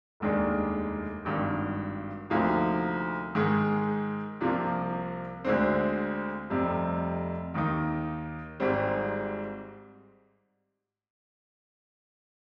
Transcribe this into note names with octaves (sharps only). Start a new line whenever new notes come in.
F1 D#2 D#3 G#3 D4
G#1 G2 D#3
D2 C3 F3 A#3 D#4
G#2 D#3 G#3
C2 C3 F3 A#3
D2 D3 G#3 C4
F1 F2 C3 G3
D#2 D#3 A#3 D#4
G#1 G#2 G3 C4